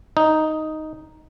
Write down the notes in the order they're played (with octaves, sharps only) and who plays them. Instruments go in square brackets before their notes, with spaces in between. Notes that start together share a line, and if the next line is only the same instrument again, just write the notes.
[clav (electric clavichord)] D#4